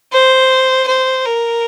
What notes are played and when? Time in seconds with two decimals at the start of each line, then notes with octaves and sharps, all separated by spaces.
0.13 C5
0.87 C5
1.25 A#4